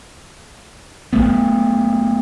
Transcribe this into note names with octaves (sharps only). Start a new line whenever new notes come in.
F#1 F2 A3 B3